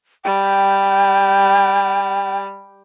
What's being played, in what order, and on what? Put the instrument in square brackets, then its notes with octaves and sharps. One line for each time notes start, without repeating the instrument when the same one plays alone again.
[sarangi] G3 [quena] G5